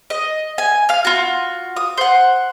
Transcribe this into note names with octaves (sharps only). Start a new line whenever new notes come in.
D#5
G#5
F5 F6
F4 F#4
D#6
C5 F#5